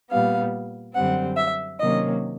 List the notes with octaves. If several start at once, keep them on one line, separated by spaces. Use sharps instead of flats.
A#2 G3 B3 F5
F#2 D3 G3 C4 F#5
E5
C3 D#3 F#3 A#3 C#4 D#5